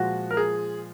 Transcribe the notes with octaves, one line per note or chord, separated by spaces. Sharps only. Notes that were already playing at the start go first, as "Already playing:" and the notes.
Already playing: A#2 F3 G#3 F#4
A#4
G#4